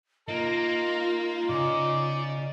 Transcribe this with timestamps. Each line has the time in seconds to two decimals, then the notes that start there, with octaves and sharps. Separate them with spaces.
0.28 A#3 D#4 F4 A#4
1.50 C#3 D5